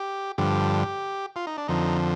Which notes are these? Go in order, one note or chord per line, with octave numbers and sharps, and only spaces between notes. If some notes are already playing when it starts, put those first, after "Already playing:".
Already playing: G4
G2 D3 F3 G4
F4
D#4
D4
F2 D3 F3 D#4